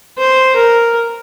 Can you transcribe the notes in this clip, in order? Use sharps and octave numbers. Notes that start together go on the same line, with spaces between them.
C5
A#4